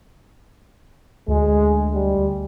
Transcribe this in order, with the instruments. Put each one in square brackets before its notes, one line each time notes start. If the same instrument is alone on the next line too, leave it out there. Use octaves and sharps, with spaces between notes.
[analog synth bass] D2 [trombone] G#3
[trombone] G3